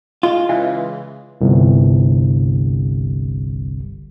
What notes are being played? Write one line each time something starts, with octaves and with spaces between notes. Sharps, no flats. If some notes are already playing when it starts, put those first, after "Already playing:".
G#3 F4
C#3 E3 G#3
G1 C2